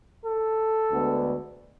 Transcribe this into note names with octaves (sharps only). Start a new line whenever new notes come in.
A4
D2 D3 G#3 B3